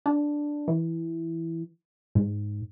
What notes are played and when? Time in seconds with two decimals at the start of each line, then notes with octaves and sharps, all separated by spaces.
0.06 D4
0.68 E3
2.15 G#2